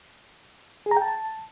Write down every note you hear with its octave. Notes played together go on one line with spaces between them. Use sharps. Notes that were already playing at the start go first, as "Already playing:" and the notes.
G#4
A#5
G5
A5